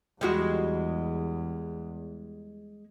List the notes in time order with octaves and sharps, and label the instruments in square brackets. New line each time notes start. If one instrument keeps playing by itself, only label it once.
[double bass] E2 [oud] G3 G#3 F#4